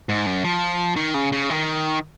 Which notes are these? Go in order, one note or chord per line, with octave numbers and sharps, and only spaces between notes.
G#2
F#2
F3
D#3
C#3
C#3
D#3